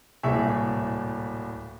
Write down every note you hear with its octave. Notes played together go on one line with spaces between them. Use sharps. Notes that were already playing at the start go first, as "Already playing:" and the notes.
D1 C2 A#2 G#4 E5 C#6